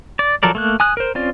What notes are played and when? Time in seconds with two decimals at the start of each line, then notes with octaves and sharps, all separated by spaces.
0.19 D5
0.43 F3 F#3 A4 A#4 D5
0.55 A3 A#3 F#6
0.80 G#5 D#6 F#6
0.97 A#4 C5
1.15 C4 C#4 F4 D5